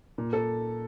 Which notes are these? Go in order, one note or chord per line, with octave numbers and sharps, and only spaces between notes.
A#2
A4